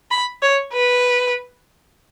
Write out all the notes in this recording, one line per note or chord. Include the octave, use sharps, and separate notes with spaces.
B5
C#5
B4